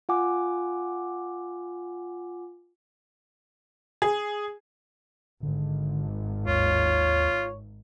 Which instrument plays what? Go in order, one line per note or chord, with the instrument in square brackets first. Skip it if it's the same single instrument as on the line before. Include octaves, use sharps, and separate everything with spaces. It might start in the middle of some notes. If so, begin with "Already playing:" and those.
[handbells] F4 F#5 G#5 D6
[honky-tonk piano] G#4
[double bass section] G#1 [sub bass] D3
[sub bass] D#2 [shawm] F4 [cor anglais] C#5